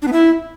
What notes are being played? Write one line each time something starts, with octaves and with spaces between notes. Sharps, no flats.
D4
B3
E4